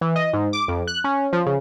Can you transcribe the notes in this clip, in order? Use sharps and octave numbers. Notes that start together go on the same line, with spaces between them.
E3
D#5
G#2
D6
F2
F#6
C#4
F3
C#3